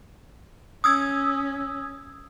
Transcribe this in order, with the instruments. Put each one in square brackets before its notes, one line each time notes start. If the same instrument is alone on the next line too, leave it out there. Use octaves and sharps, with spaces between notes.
[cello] C#4 [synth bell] D#6 E6 G#6